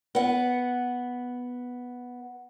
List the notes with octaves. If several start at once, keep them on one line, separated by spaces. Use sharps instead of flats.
B3 F#5